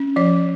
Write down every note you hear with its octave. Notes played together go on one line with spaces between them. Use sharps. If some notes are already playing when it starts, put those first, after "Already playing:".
Already playing: C#4
F3 C#5